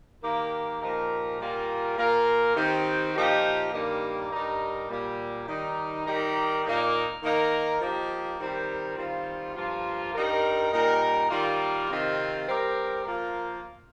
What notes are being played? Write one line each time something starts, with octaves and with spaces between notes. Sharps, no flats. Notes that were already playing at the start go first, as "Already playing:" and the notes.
D#3 A#3 G4 A#4
A#2 F3 D#4 G4 A#4
A#2 G3 A#3 F4 A#4
A#2 A#3 F4 A#4
D#3 C4 G4
A#2 F3 D#4 G4
G2 D#3 G3 A#3
G2 G3 D#4 A#4
A#2 G3 A#3
D#3 G3 D#4
D#3 G3 D#4 G4 A#4
A#2 A#3 D#4
D#3 A#3 D#4 A#4
F3 A#3 D#4 G4
D#3 G3 C4 G4 A#4
D#3 G3 C4 F4
G2 F3 A#3 F4
G2 G3 D#4 A#4
A#2 G3 D#4 A#4
D#3 G3 A#3 F4
C3 D#3 C4 F4
G3 C4 G4 A#4
F3 A#3 F4 A#4